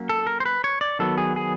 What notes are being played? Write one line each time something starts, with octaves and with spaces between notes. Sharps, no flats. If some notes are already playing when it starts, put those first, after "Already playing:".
Already playing: F#3 A#3 C#4
A4
A#4
C5
B4
C#5
D5
D#3 F#3 B3 A4
G#4
G#4